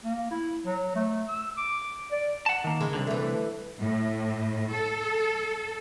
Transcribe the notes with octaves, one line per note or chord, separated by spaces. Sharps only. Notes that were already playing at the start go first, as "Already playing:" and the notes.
A#3
E4
F#3
A3
E6
D6
D5
F#5 A5
D#3 A#3
C#3 G#3
C2 G#2 D3
E3 A3
A2
A4